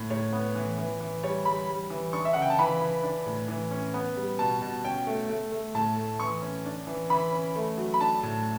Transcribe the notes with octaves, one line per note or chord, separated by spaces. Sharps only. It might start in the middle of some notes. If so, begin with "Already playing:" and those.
Already playing: A2
A2 C#5
B3
E3
E3
E3
G3 C#5
G3 B5
G3
E3
D4 C#6
E5
C#3 F#5
G5
A5
E3 B5
E3
D4
A2
E3
C#4
B3
G3
B2 A5
B2
C#4 G5
A3
A3
A3
A2 A5
A3
E3 C#6
C#4
D4
E3
E3 B5
C#4
A3
F#3
B5
D4 A5
A2